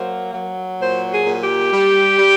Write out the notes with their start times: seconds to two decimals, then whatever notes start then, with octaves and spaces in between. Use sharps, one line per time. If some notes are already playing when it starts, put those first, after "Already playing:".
Already playing: F#3 A#3 C5
0.34 F#3
0.80 A#2 C5
1.11 G#4
1.26 A#2
1.41 G4
1.73 G3
2.19 G3